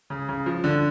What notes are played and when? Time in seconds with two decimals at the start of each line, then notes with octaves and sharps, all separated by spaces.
0.10 C#3
0.29 C#3
0.46 F3
0.64 D3